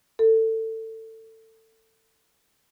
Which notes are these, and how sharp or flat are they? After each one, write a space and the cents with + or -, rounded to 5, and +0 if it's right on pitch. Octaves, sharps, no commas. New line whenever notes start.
A4 +20